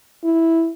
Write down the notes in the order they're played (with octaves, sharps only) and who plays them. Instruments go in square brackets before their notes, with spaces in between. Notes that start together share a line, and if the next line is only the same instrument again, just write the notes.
[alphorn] E4